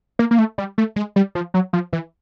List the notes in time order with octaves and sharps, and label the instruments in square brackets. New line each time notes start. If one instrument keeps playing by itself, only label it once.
[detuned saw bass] A#3
A#3
A3
G3
A3
G#3
G3
F3
F#3
F3
E3